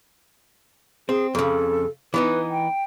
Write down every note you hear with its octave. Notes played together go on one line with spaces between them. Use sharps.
C4 G#4
F2 C#3 A4
E3 B3 D#4 B4
G5